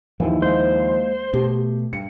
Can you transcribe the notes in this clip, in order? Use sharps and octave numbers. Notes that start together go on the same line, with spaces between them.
D#2 E3 F3 E4
G#3 A#3 C5
B2 A3 G4
G2 C#7